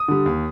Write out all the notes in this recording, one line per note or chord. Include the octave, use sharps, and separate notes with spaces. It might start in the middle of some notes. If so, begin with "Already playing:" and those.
Already playing: D#6
D3 G3
D#2